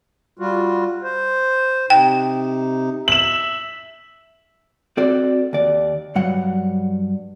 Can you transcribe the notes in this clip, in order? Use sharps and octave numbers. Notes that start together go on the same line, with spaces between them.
G3 F4 F#4
C5
C3 D#4 G5
E5 E7 F#7
C4 F#4 A4 D5
D#2 D5
G2 F#3 F#5